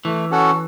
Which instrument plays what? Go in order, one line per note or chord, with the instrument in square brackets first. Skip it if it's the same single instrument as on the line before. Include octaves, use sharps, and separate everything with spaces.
[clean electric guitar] E3 [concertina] A3
[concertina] C#4 F#4 A4 F#5